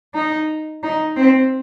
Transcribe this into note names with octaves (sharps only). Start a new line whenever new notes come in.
D#4
D#4
C4